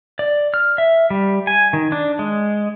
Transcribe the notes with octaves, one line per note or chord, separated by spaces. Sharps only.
D5
F6
E5
G3
G#5
D#3
D4
G#3